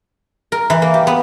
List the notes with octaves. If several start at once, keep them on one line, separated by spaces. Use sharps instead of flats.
A#4
E3
A#3
G4
B3